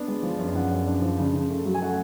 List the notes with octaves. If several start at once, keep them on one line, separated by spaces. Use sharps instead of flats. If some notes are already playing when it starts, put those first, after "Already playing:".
Already playing: B3 D4
G#3
F3
F#2
F3 F#5
F#2
D4
F3
C#3
C#3
A3
F#3
G#5
A3 F#5